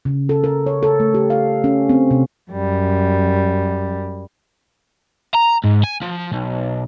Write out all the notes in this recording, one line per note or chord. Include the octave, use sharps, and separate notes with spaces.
C#3
A4
A#4
C#5
A4
A3
G4
F5
C#4
C4
C3
F#2 G3
A#5
G#2
G#5
F3
B1